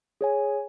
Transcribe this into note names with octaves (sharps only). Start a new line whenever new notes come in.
G#4 C#5 G#5